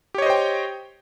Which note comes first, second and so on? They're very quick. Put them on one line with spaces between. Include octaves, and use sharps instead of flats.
G4 C#5 D#5 C5 G5